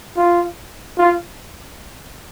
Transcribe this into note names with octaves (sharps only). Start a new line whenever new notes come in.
F4
F4